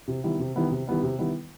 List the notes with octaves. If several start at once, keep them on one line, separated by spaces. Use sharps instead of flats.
C3
D#3 G3 B3 E4
C3
D#3 G3 B3 E4
C3
D#3 G3 B3 E4
C3
D#3 G3 B3 E4